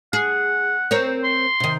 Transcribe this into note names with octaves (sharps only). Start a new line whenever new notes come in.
G#4 F#5
C4 A#4 C#5
C6
C3 D#3